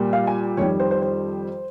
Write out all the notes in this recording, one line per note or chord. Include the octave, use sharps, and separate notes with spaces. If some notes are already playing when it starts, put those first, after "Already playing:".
Already playing: A#2 G3 A#3
F5
G#5
F2 D#3 G3 C#5
C5
C5
C5